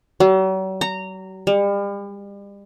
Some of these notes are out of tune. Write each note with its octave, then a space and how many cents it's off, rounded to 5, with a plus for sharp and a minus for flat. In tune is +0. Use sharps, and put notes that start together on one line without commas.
F#3 +45
A#5 -15
G3 +40